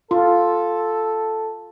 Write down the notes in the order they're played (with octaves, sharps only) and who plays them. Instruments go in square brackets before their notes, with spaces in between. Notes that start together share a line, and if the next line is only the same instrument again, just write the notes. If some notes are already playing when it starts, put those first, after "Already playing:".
[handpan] F4 [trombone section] A4